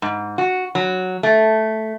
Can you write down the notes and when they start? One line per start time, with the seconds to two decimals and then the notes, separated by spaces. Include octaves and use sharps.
0.02 G#2
0.38 F#4
0.75 F#3
1.23 A3